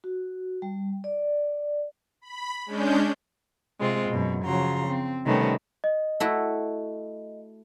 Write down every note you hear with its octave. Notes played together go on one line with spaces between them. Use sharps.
F#4
G3
D5
B5
G#3 C#4 D4 G6
C3 G#3 C4 F4
F#2 B2
C#3 F3 F#3 A#5 C6
C4
C3 D#3 G3 A3 B3 C#4
D#5
A3 E4 F#4